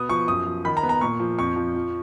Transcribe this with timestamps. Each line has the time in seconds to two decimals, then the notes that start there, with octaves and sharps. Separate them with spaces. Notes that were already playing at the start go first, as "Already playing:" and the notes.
Already playing: B2 B3 D#6
0.09 F3 C#6
0.28 F#2 D#6
0.46 F3
0.64 D#3 B5
0.77 A#5
0.83 B3
0.89 A#5
1.01 A#2 C#6
1.20 F3
1.38 F2 C#6
1.56 F3
1.75 F3